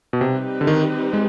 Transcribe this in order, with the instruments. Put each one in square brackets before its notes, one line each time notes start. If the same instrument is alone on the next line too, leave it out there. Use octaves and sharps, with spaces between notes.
[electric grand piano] B2
[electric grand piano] C3 [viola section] G3 C4 D#4 G4 B4
[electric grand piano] D3
D#3
G#3